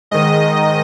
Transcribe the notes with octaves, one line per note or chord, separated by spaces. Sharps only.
G#2 D#3 D#5